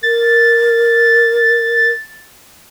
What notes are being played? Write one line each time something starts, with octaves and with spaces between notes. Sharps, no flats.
A#4 A6